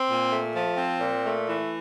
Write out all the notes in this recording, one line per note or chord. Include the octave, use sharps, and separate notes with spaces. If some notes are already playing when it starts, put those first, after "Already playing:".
Already playing: C4
A#2
A3
F3
C4
A#2
A3
E3